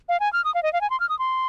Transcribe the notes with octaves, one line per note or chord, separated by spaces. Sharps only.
F5
G#5
F6
D#6
F5
D#5
F5
G#5
C6
F6
D#6
C6